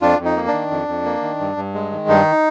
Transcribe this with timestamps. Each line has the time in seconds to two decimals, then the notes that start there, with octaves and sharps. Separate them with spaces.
0.01 F2 D4 F4
0.19 F2
0.25 D#4
0.36 A#3
0.48 D4
0.53 D#3
0.71 F2
0.88 F2
1.04 A#3
1.22 D#3
1.40 G2
1.57 G2
1.74 G#3
1.92 D#3
2.08 G2 D#4